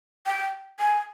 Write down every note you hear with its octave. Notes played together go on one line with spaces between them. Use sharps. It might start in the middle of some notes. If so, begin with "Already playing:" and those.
G5
G#5